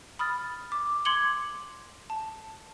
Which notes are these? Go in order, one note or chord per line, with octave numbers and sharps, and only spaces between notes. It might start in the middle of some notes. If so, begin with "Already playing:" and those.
B5 D#6 F6 A6
D6
C6 D6 G#6 C#7 F#7 G7
A5